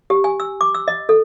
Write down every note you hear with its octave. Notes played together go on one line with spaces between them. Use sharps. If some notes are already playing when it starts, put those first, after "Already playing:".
G4
G#5
E6
D6
E6
D#5
A4